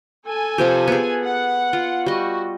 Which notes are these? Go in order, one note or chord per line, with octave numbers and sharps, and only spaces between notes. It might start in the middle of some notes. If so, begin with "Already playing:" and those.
A4 G#5
C3 F3 G4
B3 G#4
F#5
F4
G3 F#4 D#5